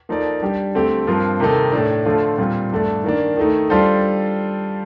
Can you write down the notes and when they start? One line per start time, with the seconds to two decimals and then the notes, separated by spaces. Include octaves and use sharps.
0.09 F3 A#3 D#4 A4 D5
0.42 G3 D4 G4
0.75 D3 A3 C4 G4
1.07 G2 F3 C4 F4 A#4
1.40 C3 D#3 A#3 D#4 A4
1.72 A2 A3 D4
2.05 D3 F3 A3 D4 F4
2.38 A#2 G3 C4 F4
2.72 G2 D3 A3 D4
3.04 D#3 A#3 D4
3.37 D#3 A3 D#4
3.70 G3 D4 F4 A4 C5